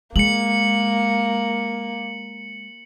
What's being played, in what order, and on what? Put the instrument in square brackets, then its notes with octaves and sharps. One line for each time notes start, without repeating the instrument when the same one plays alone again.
[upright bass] G#3 [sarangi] A#3 [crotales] C#7 F#7